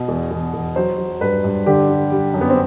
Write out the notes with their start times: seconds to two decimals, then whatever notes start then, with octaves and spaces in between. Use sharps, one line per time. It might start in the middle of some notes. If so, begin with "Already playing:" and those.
Already playing: B2
0.08 E2
0.31 E2
0.53 E2
0.76 F#3 C5
0.98 F#3
1.21 G2 B4
1.44 G2
1.66 D3 G4
1.89 G3
2.12 G3
2.34 F#2
2.41 B3
2.49 C4